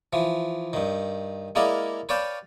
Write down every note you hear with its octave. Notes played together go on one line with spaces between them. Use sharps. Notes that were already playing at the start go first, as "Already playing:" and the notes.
E3 F3
G2 D#3
G#3 A#3 E4 D5 D#5 F5
B4 C#5 D5 F5 G5 A5